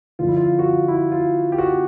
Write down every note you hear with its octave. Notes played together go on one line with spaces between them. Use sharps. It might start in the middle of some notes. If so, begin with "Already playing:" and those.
F2 D3 F3 F4
E4
F4
F#4
F4
E4
F4
G4
F#4